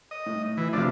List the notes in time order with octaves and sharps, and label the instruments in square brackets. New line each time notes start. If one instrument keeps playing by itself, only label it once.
[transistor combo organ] D#5
[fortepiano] A2
[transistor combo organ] E3
[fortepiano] B1 A2 C3 [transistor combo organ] F3 D4